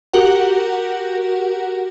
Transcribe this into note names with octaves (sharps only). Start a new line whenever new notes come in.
F#4 G4 A#4 F#5